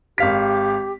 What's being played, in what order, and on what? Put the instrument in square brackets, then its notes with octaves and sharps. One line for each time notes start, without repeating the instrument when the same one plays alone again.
[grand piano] G#1 F5 B6 [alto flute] G4